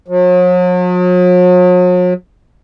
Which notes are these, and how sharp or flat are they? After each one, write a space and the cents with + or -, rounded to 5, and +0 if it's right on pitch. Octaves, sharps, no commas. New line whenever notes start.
F#3 -45